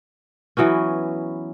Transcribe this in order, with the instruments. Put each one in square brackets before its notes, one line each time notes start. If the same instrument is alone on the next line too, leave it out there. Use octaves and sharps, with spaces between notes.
[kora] E3 F#3 B3 C#4